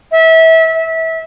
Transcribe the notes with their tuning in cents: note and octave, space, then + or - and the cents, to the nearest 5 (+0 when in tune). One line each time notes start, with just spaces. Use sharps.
E5 -25
E5 -25